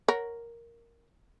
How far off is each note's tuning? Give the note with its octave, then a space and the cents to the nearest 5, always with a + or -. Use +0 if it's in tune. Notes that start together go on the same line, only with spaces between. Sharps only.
A#4 +0 C#5 +0 F#5 +0